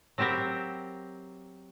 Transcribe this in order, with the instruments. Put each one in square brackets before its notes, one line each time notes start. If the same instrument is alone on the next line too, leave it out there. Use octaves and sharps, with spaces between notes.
[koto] F#3 C4 E4 G4 A#4